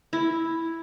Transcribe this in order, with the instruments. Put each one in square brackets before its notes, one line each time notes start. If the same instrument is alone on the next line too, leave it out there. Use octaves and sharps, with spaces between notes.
[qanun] E4